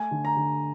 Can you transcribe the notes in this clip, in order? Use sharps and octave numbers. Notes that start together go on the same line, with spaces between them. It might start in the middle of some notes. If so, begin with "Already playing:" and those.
Already playing: A3 G#5
D3
A#5
D3